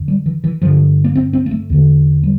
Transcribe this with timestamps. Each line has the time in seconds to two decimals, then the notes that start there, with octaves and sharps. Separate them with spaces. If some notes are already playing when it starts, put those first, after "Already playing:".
Already playing: F2 D3
0.08 G3
0.26 E3
0.44 E3
0.62 G2 D3 F3
1.04 A#3
1.15 C4
1.33 C4
1.46 A#3
1.51 A3
1.70 E2 D3
2.23 G3